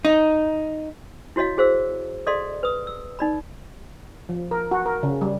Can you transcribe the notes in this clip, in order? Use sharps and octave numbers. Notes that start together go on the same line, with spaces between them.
D#4
E4 F#4 C#5 D#5 F5
F#4 G#4 C5 F5 E6
G#4 A4 D5 D#5 F5 C6
B4 D#6
E6
D#4 D5 B5
F3
A#4
F#4
A#4
C#3
G3